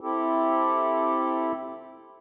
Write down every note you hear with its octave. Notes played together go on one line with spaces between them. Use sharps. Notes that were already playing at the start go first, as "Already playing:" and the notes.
C4 E4 G4 A4